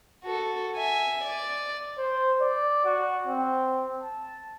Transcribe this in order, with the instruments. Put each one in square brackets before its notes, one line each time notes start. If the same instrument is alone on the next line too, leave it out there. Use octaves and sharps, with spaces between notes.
[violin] F#4 A4
E5 G#5
D5
[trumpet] C5
D5
F#4
C4
A5